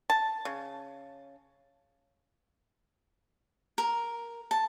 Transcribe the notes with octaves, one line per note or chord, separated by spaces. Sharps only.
A5
C#3
A#4
A5